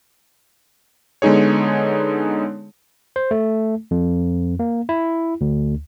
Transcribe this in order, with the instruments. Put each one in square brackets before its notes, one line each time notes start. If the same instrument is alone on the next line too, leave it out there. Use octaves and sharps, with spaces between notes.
[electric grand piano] D3 G#3 B3 D#4 G#4 C#5
[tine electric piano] C5
A3
F2
A#3
E4
D2